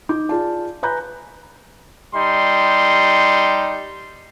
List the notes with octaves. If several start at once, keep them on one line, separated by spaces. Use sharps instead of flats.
D#4 D6 G6
F4 G#4 D5 A5
B4 G#5 A#5 B5 F#6 G6
G3 D#4 C6